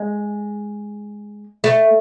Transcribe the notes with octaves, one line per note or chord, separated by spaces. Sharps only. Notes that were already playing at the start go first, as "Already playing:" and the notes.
Already playing: G#3
A3